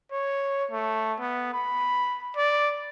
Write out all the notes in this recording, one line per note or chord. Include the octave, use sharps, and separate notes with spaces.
C#5
A3
B3
B5
D5